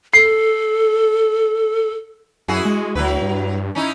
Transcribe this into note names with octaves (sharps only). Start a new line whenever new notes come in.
A4 C7
F#2 E4 F#4 G#4
G#3
D2 F#3 E4 B4
G2
C#4 D#4 E4